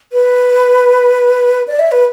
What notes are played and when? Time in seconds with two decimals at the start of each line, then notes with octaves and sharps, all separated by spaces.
0.13 B4
1.68 D5
1.79 E5
1.92 B4